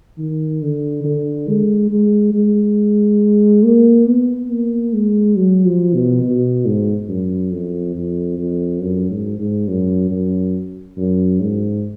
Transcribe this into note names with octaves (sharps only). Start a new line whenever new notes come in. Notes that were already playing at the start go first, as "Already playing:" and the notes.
D#3
D3
D3
G#3
G#3
G#3
A#3
B3
A#3
G#3
F#3
F3
B2
B2
G#2
F#2
F2
F2
F2
F#2
G#2
G#2
F#2
F#2
F#2
G#2